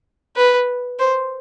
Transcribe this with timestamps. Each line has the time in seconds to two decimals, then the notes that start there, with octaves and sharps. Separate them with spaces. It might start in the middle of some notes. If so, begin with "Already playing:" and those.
0.36 B4
0.99 C5